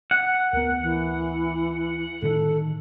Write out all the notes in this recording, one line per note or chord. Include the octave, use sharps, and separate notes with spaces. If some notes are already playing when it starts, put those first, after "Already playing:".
F#5
D2 B3 A#4
E3
A2 D3 D#3 A4